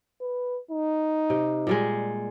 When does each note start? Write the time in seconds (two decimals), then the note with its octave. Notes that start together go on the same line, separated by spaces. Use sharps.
0.21 B4
0.71 D#4
1.30 C3
1.67 A#2 G3 G#3